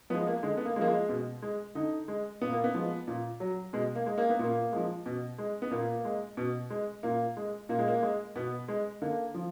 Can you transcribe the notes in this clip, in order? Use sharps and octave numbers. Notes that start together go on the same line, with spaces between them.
F3 G#3 B3
A#3
D3 G#3
B3
A#3
G#3
F3 A#3
G#3
B2
G#3
D3 D#4
G#3
A#2 B3
A#3
B3
F3 G#3
A#2
F#3
B2 G#3
A#3
G#3
A#3
B3
A#2 A#3
F3 G#3
B2
G#3
B3
A#2 A#3
G#3
B2
G#3
A#2 A#3
G#3
A#2 A#3
G#3
A#3
G#3
B2 B3
G#3
D3 A#3
F3